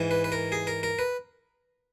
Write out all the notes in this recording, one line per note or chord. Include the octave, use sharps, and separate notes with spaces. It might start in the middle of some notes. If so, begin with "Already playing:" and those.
Already playing: G#2 E3
B4
B4
A#4
G#4
A#4
A#4
B4